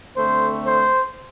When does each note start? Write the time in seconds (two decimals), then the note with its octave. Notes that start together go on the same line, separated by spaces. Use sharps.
0.15 D3 A3 C4 C5
0.67 C5